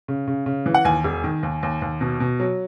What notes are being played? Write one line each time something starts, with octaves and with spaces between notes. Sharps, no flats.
C#3
C#3
C#3
E3
F#5
D#2 G#5
E1
D#3
D#2
D#2
D#2
B2
B2
F#3